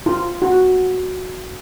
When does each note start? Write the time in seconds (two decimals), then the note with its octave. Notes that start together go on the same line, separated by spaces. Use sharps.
0.06 F4
0.42 F#4